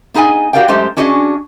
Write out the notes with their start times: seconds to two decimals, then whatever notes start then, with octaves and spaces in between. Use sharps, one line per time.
0.14 B3 D#4 G#4 D#5 G#5
0.53 F#4 G4 A#4 D5 F5 G5
0.68 F#2 G#3 A3 G4 C5
0.97 C#4 D4 F#4 G#4 D5 D#5